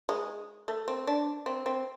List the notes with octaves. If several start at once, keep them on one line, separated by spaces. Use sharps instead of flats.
G#3
A3
C4
D4
C4
C4